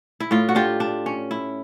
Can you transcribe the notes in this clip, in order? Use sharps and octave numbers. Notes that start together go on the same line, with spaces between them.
E4
A2 F4
F#4
D4 F4 G4
D4
C#4
E4